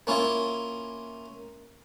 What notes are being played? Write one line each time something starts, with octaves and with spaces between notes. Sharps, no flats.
A#3 C#4 E4 F4